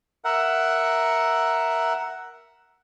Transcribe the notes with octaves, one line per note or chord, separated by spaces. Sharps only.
A#4 E5 F#5